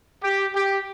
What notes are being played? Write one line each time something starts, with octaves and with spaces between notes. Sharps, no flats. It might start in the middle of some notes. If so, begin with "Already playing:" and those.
G4
G4